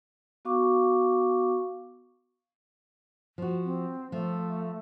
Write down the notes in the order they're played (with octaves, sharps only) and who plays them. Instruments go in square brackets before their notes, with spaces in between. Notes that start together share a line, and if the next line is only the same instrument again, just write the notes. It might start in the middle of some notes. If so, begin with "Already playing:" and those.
[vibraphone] B3 F#4 F5 C#6 D6
[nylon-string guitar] F3 F#4
[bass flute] C4
[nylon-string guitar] F3 F4 [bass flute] A3